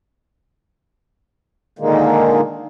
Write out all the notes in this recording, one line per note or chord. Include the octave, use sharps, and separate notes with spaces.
A#2 D3 D#3 G#3 A#3